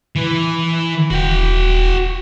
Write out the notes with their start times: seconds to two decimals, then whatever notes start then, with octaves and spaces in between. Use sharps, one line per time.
0.16 E3 B4
1.11 D#1 F#4 G5